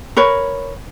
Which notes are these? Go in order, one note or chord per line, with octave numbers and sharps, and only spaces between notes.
A#4 B4 C#5